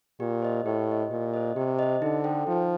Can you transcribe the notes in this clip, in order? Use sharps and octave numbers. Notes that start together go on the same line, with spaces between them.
A#2 G4
C5 D#5
A2 G4
C5 D#5
A#2 G4
C5 D#5
C3 G4
C5 D#5
D3 D#4
A4 C5 G5
F3 D#4